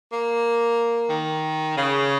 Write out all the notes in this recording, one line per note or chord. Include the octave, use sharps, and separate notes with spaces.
A#3
D#3
C#3